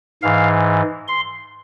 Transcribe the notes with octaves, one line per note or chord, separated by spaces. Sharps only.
G#2 E3 F5
C6